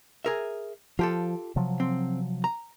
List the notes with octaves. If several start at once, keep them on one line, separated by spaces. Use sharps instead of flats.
G#4 A#4 E5
F3 F4 G4 A4
C3 F3 F#3
C4
A#5